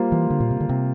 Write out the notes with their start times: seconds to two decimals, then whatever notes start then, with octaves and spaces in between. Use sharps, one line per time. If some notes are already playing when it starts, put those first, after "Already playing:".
Already playing: G3 A#3 F4 C5
0.12 E3
0.30 D3
0.40 A#2
0.51 C3
0.61 D3
0.69 C3